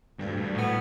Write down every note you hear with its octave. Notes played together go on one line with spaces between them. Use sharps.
D2 G2
G2
A2 B3